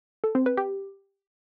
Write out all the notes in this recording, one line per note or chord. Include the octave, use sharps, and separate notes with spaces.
A4
C4
B4
G4